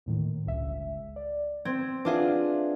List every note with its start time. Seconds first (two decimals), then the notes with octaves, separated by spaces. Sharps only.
0.06 D#2 A2 D#3
0.46 G1 C#2 E5
1.16 D5
1.65 C4 G#6
2.05 D4 F4 G#4 B4 E5 F#5